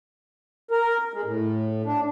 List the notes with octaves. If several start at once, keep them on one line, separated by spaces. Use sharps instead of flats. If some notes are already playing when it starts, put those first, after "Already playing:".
A#4
G#3
A2
D4